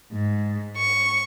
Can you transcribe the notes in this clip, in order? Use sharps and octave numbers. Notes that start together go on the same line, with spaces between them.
G#2
C#6